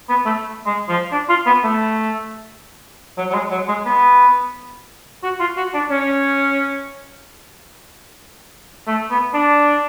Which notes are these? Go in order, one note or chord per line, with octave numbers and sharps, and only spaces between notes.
B3
A3
G#3
F3
D4
F4
B3
A3
F#3
F#3
G#3
F#3
G#3
B3
F#4
F4
F#4
D4
C#4
A3
B3
D4